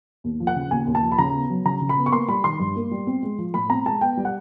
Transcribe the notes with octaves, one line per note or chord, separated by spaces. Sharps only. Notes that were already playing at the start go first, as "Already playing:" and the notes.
D#2
F3
F#5
C#3
D#2 G#5
D#2
A5
F3
B5
C#3 A#5
B3
F#3
C#3 A#5
C#3
B5
B3
C#6
A#3 C6
G3 B5
D#3 C6
G2
A#3
G3
C4
G#3
F3
A2 B5
C4 A#5
G#3 A5
B3 G5
G3
F#5